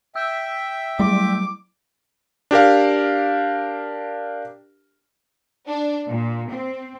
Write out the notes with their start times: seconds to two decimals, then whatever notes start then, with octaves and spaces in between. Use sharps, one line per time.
0.16 E5 G5 E6
0.99 F#3 G3 A3 E4 D6
2.51 D4 G4 A#4 F5
5.69 D4
6.08 A#2
6.50 C4